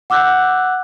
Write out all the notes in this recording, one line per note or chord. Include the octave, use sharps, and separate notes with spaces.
F#5 D6 E6 F#6 G6